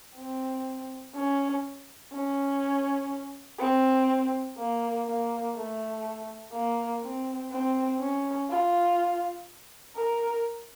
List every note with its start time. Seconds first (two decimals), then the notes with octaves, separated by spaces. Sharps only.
0.17 C4
1.15 C#4
2.13 C#4
3.60 C4
4.58 A#3
5.07 A#3
5.56 A3
6.53 A#3
7.02 C4
7.52 C4
8.00 C#4
8.50 F4
9.96 A#4